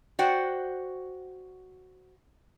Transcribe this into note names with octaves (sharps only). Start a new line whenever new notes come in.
F#4 C5 D5 F#5 G5